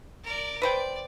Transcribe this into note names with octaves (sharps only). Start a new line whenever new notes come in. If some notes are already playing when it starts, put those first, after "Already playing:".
A#4 D5
B4 C5 D5 G5